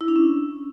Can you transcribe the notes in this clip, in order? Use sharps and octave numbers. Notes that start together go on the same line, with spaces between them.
E4
D4
C#4